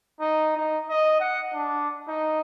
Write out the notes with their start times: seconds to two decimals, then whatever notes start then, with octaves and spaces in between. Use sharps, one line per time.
0.20 D#4
0.57 D#4
0.89 D#5
1.20 F#5
1.54 D4
2.08 D#4